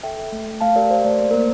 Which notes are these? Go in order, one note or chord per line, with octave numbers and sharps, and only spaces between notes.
A4 E5 G5
A4
A3
A3
A3 F5 A5
G4 A#4 D5
G4 C5
A3 D5
A#3 C5
A#3 A#4